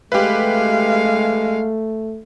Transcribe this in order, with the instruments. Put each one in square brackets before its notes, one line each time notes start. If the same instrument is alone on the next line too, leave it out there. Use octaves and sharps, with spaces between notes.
[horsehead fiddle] G#3 F5 [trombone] A3 [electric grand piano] G4 B4